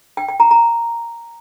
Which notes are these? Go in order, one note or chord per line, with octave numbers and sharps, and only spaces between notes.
G5
G5
A#5
A#5